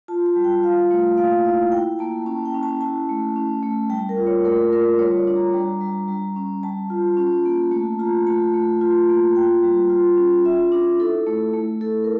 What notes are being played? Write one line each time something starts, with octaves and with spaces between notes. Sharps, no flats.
F4 A5
A5
G3
G5
F4 F5
A3
A#3 F5
E4
E4 G5
A#3 A5
C#4 A5
G5
C#4
A5
E4 A5
A3
C#4
A3
G3 G5
A#4
F4
C#5
A3 A#4
F4 A#4
G3 C#5
D5
D4
A#5
G3
G3
G3
C#4
G3 A5
F4
C#4
A#3
A3 A5
F4 A#5
A3 A5
A3
F4
A#3
F4 G5
G3
F4
C#4
F4 E5
D4
E4 A4
A3
A3
E4 A4
A#4